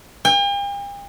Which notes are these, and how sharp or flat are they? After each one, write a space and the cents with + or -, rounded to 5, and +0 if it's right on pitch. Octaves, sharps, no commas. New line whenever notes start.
G5 +45